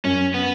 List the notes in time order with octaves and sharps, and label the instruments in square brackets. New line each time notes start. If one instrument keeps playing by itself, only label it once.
[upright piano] F#2 [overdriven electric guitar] C#4
[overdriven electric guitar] B3